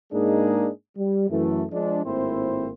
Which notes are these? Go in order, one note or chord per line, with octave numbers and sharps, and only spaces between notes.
G#2 G#3 A#3 D4 D#4 G#4
G3
F#2 E3 A3
F3 G#3 D4
G#1 A2 A#3 C4 E4 C5